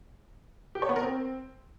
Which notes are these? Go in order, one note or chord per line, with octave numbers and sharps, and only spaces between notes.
G4
C#5
B3
A#4
C4